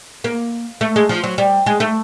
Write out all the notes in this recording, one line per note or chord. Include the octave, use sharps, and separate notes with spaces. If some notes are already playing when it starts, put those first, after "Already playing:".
A#3
A3
G#3
F3
F#3
G3
G#3
A3